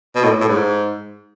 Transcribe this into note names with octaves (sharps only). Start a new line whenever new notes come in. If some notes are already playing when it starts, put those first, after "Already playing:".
B2
A2
A2
G#2